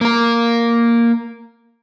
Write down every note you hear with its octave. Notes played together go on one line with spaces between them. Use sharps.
A#3 A#4